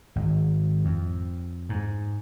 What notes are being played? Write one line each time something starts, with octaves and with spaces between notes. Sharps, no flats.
G#1
F2
G#2